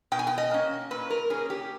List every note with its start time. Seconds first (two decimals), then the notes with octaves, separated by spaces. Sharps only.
0.12 B2 G5
0.19 G#5
0.27 G5
0.38 D#5
0.51 A#3 C#4
0.91 A#2 B4
1.10 A#4
1.30 A#3 C#4 G#4
1.50 G4